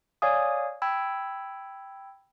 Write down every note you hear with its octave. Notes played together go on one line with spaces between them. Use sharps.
C#5 D5 F5 G#5 D#6
G5 B5 E6 G#6